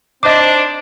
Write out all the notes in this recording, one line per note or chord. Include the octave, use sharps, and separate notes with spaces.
C4 D4 D#4 C5 D#5 D6